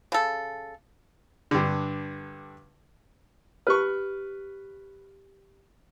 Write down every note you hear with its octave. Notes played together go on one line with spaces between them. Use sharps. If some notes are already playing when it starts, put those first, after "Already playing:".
C#3 A4
G2 D3
G4 B4 C#6 F6